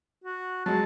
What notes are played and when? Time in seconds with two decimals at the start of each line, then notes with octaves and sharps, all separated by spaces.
0.24 F#4
0.66 F#3 G#3 A5